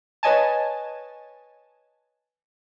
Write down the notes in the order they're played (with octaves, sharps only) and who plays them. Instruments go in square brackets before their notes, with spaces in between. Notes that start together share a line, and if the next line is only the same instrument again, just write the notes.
[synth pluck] B4 C#5 D#5 G#5 A5